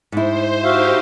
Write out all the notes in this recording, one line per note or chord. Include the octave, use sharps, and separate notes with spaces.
G#2 E4 C5
D#4 F#4 G4 C5 E5 F5